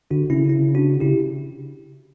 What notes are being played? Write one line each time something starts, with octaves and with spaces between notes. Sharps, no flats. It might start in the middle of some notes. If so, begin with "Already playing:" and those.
D3 D4 F#4
C#3 C#4 E4
C#4 E4
D4 F#4
C#3 E4 G4